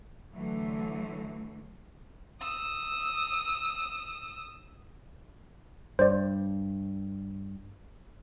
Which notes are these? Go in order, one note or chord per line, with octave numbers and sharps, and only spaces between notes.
D3 E3 F#3 A3
D#6 E6
G2 C5 D5